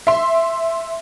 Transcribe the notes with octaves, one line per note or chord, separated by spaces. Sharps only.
E5 C6